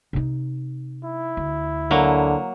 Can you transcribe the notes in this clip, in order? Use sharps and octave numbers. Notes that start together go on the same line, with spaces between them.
C3 D#4
E4
D2
D3 F#3 A#3